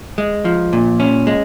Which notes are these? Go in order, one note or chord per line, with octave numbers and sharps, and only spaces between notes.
G#3
F3
A#2
C#4
G#3